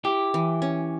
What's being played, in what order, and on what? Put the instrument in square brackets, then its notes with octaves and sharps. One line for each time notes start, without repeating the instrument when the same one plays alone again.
[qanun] E4 [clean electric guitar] G4
[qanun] E3
C#4